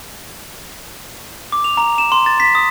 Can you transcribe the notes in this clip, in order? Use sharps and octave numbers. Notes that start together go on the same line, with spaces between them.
D6
F7
A#5
E7
C6
A6
B6
D#6